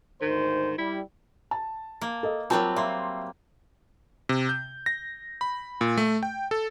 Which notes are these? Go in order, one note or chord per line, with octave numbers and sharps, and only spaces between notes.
D2 G#2 D#3 C5
G3 E4
A5
A#3
A4 D#5
F#3 G3 C4 F4 A#4 A5
A#3 E5 C6
C3
G6
A#6
B5
A#2
A3
G5
A4